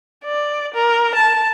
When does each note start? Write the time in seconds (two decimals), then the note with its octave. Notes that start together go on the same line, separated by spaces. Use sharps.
0.25 D5
0.74 A#4
1.15 A5